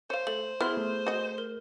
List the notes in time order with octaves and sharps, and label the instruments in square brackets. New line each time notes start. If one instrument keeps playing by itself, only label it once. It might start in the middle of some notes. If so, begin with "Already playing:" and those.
[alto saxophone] C5 [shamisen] C#5 F5
[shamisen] A3 [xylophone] F#7
[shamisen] B3 [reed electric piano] E4 [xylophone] G#4 C6 F6
[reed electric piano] A3
[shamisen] F#4 D#5
[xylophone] A#4